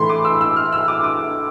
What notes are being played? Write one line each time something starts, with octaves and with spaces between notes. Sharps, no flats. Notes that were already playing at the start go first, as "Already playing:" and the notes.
Already playing: A2 E3 A3 B5 C6
D6
E6
E6
F6
E6
D6
D6